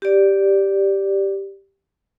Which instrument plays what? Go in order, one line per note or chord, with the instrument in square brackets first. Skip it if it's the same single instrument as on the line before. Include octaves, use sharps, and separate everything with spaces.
[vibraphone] G4 D5